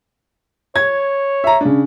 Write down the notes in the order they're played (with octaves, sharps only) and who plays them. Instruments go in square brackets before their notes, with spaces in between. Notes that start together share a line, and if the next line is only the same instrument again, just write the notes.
[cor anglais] C#5 [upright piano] G#6
[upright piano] E5 A#5
C#3 D4